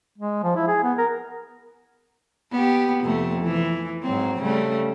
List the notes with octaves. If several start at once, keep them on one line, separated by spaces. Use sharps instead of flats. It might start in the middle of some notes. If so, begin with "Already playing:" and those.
G#3
F3
E4
G#4
B3
A#4
B3 G4
F2 C3 A3
E3
G#2 F#3 C4
C#3 G3 A3